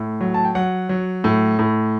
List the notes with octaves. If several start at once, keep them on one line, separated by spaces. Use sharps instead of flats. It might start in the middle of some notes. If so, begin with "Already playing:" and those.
Already playing: A2
F#3
A5
G5
F#3 F#5
F#3
A2
A2